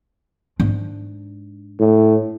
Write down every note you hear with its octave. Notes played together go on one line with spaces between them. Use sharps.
G#2 D4
A2